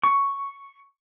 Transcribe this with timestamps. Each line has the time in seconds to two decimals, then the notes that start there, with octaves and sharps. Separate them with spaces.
0.04 C#6